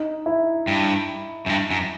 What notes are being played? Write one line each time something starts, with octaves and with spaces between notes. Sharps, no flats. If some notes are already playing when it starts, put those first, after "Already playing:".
Already playing: D#4
E4
G2
F#2
G2
F#2